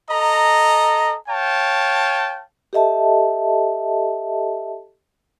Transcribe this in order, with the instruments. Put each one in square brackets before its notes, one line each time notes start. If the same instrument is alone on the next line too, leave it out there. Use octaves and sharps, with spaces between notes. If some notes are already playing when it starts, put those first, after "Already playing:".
[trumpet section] A4 D#5 A#5
C#5 F5 G5 A5
[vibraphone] G4 A4 D#5 E5 A5